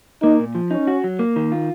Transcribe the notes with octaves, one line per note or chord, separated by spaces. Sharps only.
A#3 D#4
A#2
F3
C#4 D#4
F#4
F#3
A#3
D#3
F4